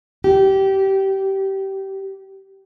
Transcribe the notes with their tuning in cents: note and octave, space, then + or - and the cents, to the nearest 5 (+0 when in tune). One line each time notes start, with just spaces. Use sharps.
G4 -20